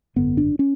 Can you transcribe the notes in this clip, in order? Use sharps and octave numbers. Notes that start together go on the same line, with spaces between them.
G#1 F#2 D3 B3
D4
C#4